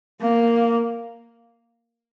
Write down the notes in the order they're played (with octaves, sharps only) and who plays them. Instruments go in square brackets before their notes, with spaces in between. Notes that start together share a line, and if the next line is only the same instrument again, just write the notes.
[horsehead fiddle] A#3